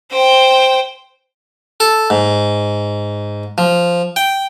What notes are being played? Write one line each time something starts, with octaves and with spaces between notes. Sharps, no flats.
C5 G5
A4
G#2
F3
G5